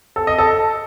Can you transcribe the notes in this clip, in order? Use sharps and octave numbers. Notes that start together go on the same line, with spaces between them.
A4
D#5
A4